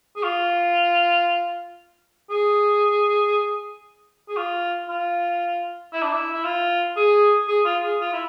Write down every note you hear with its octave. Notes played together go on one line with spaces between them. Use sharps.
G#4
F4
G#4
G#4
F4
F4
E4
D4
E4
E4
F4
G#4
G#4
F4
G#4
F4
E4